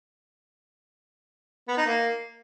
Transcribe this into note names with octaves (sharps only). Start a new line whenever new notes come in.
B3
D#4
A#3